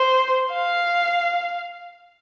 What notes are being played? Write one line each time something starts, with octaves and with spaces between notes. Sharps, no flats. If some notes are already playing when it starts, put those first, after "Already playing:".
Already playing: C5
F5